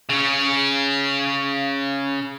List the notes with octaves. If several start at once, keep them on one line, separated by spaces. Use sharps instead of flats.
C#3 C#4